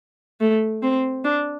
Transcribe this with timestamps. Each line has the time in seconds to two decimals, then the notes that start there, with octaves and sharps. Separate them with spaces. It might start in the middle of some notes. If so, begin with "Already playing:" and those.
0.41 A3
0.82 C4
1.25 D4